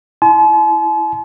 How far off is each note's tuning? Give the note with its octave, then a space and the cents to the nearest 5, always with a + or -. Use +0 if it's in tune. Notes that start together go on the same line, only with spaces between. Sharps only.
E4 +0 A5 -45 C6 -25